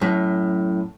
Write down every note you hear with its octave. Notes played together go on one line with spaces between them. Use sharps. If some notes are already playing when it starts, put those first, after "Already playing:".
F#2 A2